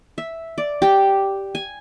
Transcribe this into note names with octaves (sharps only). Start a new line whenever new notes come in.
E5
D5
G4
G#5